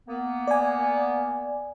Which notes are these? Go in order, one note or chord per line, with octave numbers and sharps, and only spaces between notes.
A#3 B3
D5 G#5